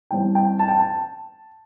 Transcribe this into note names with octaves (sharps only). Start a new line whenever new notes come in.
E3 G3 C4 G5
G5
A5
G5
A5